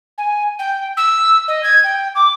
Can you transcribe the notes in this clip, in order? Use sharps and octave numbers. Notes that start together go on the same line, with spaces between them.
G#5
G5
E6
D#5
G#6
G5
D6